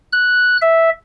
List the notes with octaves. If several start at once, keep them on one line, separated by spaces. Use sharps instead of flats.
F#6
E5